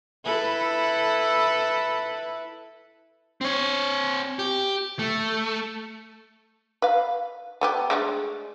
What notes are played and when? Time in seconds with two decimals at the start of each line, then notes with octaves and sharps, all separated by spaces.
0.25 E4 A4 B4
3.41 C4 C#5
4.39 G4
4.99 A3
6.82 B4 F5
7.61 A3 B3 G4
7.90 G#3 A3 D4